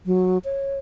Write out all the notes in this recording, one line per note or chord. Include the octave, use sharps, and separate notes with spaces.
F#3
C#5